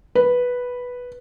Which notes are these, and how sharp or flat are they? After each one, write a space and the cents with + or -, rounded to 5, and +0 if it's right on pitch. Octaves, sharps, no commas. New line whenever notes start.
B4 -5